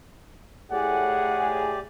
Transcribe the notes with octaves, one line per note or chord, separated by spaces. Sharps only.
A2 G4 G#4 D5 F#5